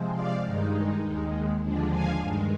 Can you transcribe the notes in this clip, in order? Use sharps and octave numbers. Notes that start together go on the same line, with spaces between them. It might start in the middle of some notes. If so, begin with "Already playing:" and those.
Already playing: C3 F3 G#3 C4
D5 F5
G2 D#3 G#3 D#4
D#2 D#3 G#3
D#2 D3 F3 G#3 D4
F5 G#5
G2 D#3 G#3